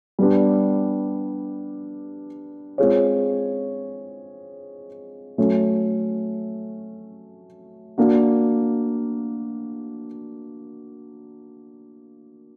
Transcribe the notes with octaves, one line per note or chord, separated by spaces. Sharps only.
G3 B3 D4
G#3 C4 F4 G#4 C#5
F#3 A3 C#4
A#3 D4 F#4